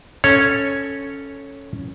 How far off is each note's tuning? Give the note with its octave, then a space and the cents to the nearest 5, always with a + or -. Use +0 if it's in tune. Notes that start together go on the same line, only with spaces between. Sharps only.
C#4 +0 A4 +0 C#5 -5